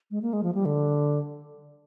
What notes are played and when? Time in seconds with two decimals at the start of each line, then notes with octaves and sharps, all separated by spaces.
0.11 G#3
0.22 A#3
0.33 G#3
0.43 F3
0.55 G3
0.65 D3